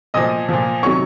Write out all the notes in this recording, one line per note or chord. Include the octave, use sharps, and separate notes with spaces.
A#2 F3 D#5 D#6
A#2 F3
C3 D#3 F#3 C#5 C#6